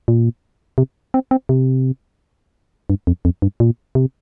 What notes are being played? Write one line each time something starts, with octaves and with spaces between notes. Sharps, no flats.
A#2
C3
C4
C4
C3
G2
F2
F2
G2
A#2
C3